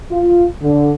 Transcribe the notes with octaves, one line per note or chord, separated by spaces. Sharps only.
F4
D3